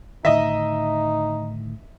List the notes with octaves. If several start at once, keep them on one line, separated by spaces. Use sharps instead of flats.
A2 D3 D#3 D#4 D#5 E5